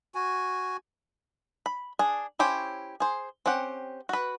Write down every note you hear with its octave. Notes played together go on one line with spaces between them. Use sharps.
F#4 G#5
B5
D4 G#4
C#4 E4 G4 C5 C#5
G#4 C5
C4 C#4 G4 F#5
F#4 B4